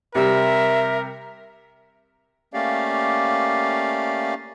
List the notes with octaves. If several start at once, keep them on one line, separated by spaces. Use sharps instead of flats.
C3 G3 A#4 E5
A3 A#3 C#4 G4 D5 F5